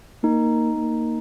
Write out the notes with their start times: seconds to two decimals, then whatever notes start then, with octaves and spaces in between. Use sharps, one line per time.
0.23 A#3 D#4
0.77 A#3